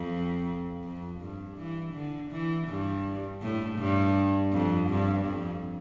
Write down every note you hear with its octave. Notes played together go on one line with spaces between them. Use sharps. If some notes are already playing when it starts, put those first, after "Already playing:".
Already playing: F2
F2
G2
E3
D3
E3
G2
A2
G2
F2
G2
F2